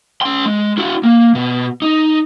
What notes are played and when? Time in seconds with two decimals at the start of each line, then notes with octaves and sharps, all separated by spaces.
0.22 C#4 C6
0.46 G#3
0.77 E4 F#4
1.03 A#3
1.35 B2
1.82 D#4